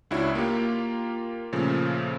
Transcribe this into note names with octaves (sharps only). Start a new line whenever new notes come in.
C#2 D4 E4 F#4 C#5
A#3 F4 G4
A#2 C#3 F3 A3